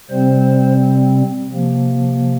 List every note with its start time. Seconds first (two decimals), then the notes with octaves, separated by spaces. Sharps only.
0.10 C3 G3 C4 C5
1.50 C3 F3 A#3